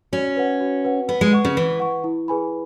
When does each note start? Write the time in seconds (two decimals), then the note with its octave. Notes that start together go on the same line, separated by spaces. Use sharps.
0.13 C#4 F#4
0.37 B4 F#5
0.60 F#4
0.85 B4 F#5
1.08 B3 B4
1.21 G#3
1.33 F#5 C#6
1.45 C#3
1.57 E3 B4
1.80 F#5 C#6
2.04 E4
2.28 G#4 B4 G#5 B5